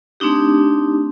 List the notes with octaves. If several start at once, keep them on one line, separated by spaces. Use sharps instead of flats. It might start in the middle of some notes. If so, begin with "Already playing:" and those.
A3 C4 D4 D#4 G4